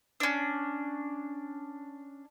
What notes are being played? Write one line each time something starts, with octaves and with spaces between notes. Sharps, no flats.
C#4 D4